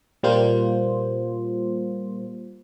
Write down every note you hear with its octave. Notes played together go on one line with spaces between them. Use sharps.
A#2 G3 A#3 F4 C5